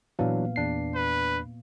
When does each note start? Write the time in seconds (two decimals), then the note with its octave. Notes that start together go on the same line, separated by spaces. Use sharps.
0.19 A#2 E3 F#3 B3 D4 F5
0.56 E2 D4 C7
0.95 B4